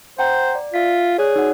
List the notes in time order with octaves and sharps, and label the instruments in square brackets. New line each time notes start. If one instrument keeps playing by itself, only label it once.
[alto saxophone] C5 [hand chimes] F#5 G5 A#5
[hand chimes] D5
[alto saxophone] F4 [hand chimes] E5 B6
[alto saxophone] G#4 [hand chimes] C#5 D5 F#6
[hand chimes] D#4 F#4 F#5